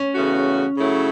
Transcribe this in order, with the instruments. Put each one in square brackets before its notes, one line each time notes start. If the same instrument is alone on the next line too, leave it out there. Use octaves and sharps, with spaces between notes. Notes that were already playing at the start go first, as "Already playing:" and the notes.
Already playing: [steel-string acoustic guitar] C#4
[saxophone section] E2 C#3 A3 F#4
C#3 F#3 A3 E4